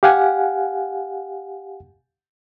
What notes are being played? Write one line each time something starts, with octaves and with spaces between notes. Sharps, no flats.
G4 F5 F#5 G#5